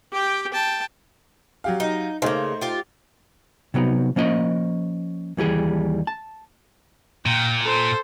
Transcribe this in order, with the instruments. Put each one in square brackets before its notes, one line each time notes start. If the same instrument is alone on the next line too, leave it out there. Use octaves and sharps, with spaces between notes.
[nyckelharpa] G4 G5
G5 A5
[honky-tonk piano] F#3 G4 F5
[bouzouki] D#4
[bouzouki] C#3 A#3 [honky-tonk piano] A3 D#4 C5
[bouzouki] F4 G4
[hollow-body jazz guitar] C3 F#3 B3 D#4
F3 A#3 C#4 D#5
D#2 E3 G3 G#4
A5
[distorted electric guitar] A#2 [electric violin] G5
[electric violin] A4 C5